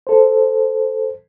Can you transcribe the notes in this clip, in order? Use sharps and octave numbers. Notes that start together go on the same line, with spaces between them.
A4 C5